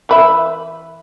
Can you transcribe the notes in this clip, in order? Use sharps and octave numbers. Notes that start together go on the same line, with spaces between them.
E3 B4 E5